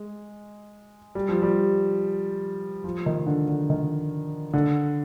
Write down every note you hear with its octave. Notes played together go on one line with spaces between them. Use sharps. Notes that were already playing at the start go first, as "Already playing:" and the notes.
Already playing: G#3
G3
F3
G3
F3
D#3
D3
D3
D#3
D3